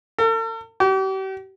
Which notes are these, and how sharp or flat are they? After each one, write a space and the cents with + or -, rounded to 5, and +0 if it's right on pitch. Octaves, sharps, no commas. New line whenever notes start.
A4 +45
G4 -40